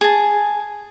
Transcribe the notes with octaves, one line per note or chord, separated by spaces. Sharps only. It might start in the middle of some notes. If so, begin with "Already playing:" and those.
G#4 A5